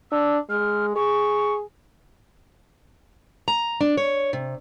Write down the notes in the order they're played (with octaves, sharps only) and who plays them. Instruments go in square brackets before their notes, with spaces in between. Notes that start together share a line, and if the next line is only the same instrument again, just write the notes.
[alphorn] D4 [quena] E6
[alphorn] G#3 [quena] F6
[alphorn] G#4 [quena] C#6
[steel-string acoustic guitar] A#5
D4
C#5
C3